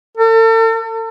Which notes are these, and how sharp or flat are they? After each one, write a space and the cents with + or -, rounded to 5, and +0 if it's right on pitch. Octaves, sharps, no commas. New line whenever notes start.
A4 +40